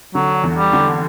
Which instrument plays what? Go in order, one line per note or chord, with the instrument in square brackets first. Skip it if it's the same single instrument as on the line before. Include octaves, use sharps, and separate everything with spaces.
[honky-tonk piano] D3 [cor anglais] F#3
[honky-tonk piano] E2
[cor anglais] G3
[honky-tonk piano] D3